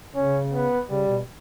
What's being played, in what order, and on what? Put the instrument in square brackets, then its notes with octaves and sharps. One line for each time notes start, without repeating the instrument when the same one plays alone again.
[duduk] C#3 [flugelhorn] C#4
[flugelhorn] B3
[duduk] C#3 [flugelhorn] G3
[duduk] B2